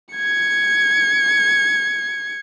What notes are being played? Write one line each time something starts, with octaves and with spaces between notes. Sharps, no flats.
G#6 C#7